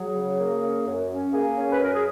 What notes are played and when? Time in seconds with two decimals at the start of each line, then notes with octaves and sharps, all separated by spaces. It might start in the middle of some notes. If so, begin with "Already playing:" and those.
Already playing: F#3 G#4
0.15 C#3
0.39 A#3
0.62 C#4
0.86 F#2
1.10 C#4
1.33 A#3 G#4
1.56 C#4
1.73 B4
1.80 F#2 A#4
1.93 G#4